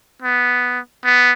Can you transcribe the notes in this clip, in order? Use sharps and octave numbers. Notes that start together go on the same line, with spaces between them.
B3
B3